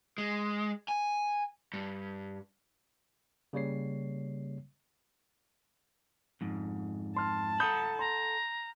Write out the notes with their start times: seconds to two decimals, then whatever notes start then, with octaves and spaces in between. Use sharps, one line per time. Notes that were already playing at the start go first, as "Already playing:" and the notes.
0.18 G#3
0.88 G#5
1.73 G2
3.53 C#3 G3 A#3 C#5 C7
6.41 F2 G#2
7.16 A5 C6 F6
7.60 A4 F#5 A#5 B5 D#6 G6
7.99 A#5 C6